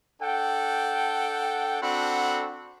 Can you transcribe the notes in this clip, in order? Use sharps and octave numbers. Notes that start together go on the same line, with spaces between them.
D4 A4 F#5 G5
C4 D4 F#4 A4 F#5 B5